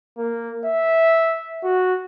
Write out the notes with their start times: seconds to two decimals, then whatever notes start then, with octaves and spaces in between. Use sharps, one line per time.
0.18 A#3
0.65 E5
1.64 F#4